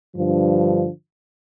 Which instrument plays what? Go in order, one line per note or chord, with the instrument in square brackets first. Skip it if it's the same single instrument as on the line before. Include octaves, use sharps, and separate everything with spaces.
[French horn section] G2 D3 F3